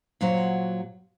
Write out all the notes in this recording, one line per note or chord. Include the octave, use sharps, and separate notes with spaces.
A#2 F#3 F#4 C5